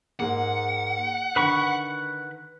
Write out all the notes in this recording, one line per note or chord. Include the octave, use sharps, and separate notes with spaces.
G#2 G#3 A#3 F#5
D3 D#3 B4 B5 C#6